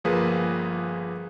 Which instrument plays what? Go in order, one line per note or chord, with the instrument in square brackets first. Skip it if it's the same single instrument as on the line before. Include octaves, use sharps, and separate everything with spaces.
[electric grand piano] G1 F3 A#3 G#4 B4